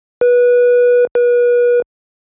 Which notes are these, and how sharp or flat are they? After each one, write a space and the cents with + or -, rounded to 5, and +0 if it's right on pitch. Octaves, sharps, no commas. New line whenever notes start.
B4 -20
B4 -35